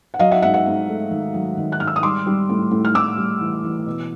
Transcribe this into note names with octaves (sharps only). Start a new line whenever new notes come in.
F#5
F#3 D#5 F5
E5 F#5
G#2 E5 F#5
E5 F#5
G#2
A3
D#3
F#3
D#3
F#6
G#2 F6
E6
D#6
G3 C6 D6
G3
A2
A2
F6
A2 D6 E6
G3
E3
E3
B2